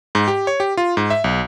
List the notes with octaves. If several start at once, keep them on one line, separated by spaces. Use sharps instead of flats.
G#2
G4
C#5
G4
F4
G#2
E5
B1